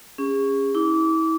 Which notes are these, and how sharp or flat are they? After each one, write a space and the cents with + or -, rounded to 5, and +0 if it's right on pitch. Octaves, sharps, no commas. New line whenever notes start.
C#4 +0 G#4 -35
E4 -35 D6 -25